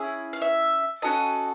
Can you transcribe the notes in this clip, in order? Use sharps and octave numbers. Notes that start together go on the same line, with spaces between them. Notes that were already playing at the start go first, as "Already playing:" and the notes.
Already playing: C#4 E4 G#4
F5
E5
C#4 F#4 A4 D#5